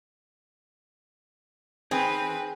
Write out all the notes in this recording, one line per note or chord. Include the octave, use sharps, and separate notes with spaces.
C4 D#4 G#4 B4 G5